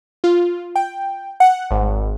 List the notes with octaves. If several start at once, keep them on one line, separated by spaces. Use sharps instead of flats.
F4
G5
F#5
G#1